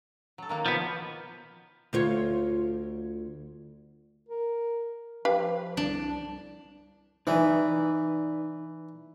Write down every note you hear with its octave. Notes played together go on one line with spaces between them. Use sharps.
F#3 A4
D#3 A#3 F#4
B2 D#3 F3 B3 F#4
D2 F4 C#5
A#4
F3 G4 B4 F5
C2 D4
E3 D#4 B4 D5